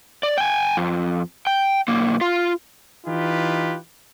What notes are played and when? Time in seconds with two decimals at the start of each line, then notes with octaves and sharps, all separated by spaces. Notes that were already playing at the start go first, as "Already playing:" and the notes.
0.23 D5
0.38 G5 G#5
0.77 F2
1.47 G5
1.88 B1 A#3
2.21 F4
3.06 E3 D#4 F4 G4 B4